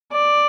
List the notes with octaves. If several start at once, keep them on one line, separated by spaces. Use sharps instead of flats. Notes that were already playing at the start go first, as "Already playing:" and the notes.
D5